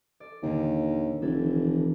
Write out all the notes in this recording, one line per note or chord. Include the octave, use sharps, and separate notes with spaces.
A4 D5
D#2 A#2 D3 D#3
F1 E3 A4 G#6